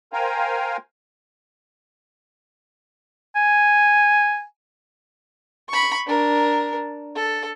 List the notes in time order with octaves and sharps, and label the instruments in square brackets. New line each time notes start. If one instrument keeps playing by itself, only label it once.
[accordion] A#4 C5 F5 G5 G#5 A#5
[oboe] G#5
[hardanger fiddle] B5 C#6
D4 A#4
A4